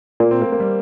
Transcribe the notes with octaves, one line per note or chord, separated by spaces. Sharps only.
A#2 A#3
C4
A#3
A#3
G3